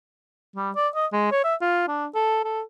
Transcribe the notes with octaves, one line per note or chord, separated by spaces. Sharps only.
G3
D5
D#5
G#3
C#5
E5
F4
D4
A4
A4